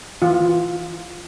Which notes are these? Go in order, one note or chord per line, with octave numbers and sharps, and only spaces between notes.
E3 F4